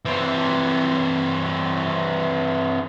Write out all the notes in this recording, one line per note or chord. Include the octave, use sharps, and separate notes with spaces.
E3 C4